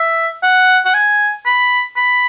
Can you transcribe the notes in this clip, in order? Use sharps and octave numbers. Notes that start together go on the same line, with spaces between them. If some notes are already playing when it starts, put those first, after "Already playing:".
Already playing: E5
F#5
F#5
G#5
B5
B5